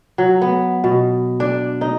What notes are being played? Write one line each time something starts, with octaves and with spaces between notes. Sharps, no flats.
F#3
B3
B2
D4
D#4